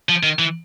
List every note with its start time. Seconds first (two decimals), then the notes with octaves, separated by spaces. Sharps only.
0.09 F3
0.23 D#3
0.39 E3